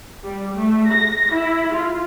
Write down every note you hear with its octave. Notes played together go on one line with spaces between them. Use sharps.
G3
A3
A#6
E4
F4